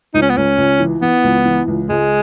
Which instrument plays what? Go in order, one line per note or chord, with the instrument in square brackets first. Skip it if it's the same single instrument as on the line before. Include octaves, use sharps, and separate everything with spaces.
[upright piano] C#2 [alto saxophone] D#4
[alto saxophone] C#4
B3
[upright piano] C#2 [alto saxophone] C#4
[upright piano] C#2
E3
[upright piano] E3 [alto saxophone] B3
[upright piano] C#2
E3
C#2
[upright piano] C#2 [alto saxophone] G#3